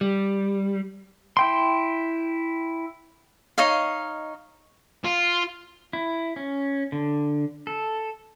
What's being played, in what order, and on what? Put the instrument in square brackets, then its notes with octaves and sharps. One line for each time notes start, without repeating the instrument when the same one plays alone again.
[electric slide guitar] G3
[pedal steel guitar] E4 G5 C6
[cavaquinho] D#4 C#5 D#5 F5
[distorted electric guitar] F4
[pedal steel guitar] E4
C#4
D3
A4